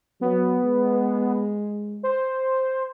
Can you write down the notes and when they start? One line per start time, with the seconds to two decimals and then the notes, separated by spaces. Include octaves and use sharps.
0.21 F#3 B3
0.63 G#3
2.03 C5